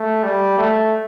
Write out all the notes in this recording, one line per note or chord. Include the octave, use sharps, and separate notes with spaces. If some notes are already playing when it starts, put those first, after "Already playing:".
Already playing: A3
G3
A3